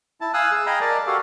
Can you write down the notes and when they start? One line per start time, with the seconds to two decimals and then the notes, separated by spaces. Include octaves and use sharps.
0.21 E4 A5
0.34 F5 G#5 D#6 E6 F#6
0.52 G#4 E6
0.66 D#5 F5 G5 G#5 A#5 B5
0.81 A#4 D5 A5
1.07 F#4 G4 A4 F5